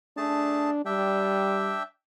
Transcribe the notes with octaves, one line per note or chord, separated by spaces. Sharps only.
A3 D4 G#4 A5
G3 D4 E5 G5